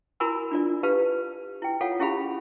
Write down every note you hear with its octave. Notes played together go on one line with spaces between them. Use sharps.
E4 F#4 A#4 G#5 B5 E6
D4 F4 D5
G4 B4 F5 A5
E4 G5
F4 A4 C#5 F5 F#5
C#4 E4 G4 G#4 F5 B5